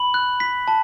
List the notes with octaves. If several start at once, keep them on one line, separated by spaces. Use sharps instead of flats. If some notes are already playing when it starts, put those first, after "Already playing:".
Already playing: B5 F#7
F#6
B6
A5